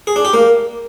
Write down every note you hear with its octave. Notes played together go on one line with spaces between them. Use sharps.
G#4
D4
G4
A#3